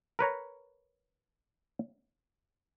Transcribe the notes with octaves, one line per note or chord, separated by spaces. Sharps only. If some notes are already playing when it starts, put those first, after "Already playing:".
A#4 B4 C#5 A#5